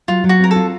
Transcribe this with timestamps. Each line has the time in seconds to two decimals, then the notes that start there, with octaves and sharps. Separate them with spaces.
0.08 F#3 F4
0.24 F#3
0.29 F#4
0.40 C4 A#4
0.51 A4
0.56 F4